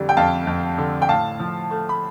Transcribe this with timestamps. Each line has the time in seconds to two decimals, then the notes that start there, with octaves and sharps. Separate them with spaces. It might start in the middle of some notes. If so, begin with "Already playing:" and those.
Already playing: F2 D3 G3
0.09 G5
0.17 F2 F5 A5
0.47 F2
0.78 D3
1.02 G5
1.09 A2 F5 A5
1.40 F3
1.71 A3
1.89 B5